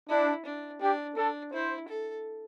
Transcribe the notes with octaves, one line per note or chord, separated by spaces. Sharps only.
D4 E4
D4
D4 G4
D4 A4
E4 C5
A4